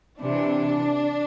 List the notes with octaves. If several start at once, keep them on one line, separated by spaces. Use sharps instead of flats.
C3 E3 D4